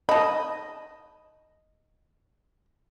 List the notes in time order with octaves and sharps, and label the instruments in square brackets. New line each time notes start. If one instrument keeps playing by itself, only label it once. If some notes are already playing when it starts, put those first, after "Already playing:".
[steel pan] D#5 [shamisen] A5 B5